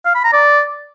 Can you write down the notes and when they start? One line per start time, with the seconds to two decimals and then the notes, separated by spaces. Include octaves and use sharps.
0.06 F5
0.15 B5
0.24 A#5
0.33 D5